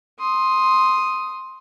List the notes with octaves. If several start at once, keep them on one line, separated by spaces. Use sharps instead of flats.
C6 D#6